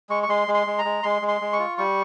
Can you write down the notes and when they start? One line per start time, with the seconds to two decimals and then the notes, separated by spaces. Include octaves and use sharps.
0.10 G#3 C#6
0.23 C#6
0.29 G#3 C6
0.48 G#3
0.54 C6
0.67 G#3
0.78 A#5
0.85 G#3
1.03 G#3 C6
1.22 G#3
1.28 C6
1.41 G#3
1.53 C#6
1.59 F4
1.78 G3 C#6